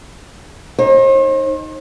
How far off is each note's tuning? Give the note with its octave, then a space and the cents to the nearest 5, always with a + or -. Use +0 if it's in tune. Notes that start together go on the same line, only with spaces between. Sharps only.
D#4 +0 C5 +45